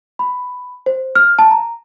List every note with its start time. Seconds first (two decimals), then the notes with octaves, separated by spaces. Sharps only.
0.19 B5
0.86 C5
1.15 F6
1.39 A5
1.51 A#5